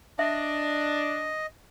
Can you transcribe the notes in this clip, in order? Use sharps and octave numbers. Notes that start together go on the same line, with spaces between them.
D4 D#5 E5